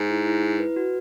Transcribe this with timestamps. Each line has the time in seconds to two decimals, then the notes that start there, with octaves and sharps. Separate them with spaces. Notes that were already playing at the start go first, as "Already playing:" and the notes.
Already playing: G#2
0.10 E4
0.27 E4
0.43 E4
0.60 B4
0.76 F#4